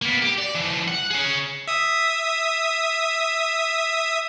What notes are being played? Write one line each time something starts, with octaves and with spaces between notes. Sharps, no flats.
A#3 B3
G4
D5
E3 F3
F#5
G#4 C#5
E5 D#6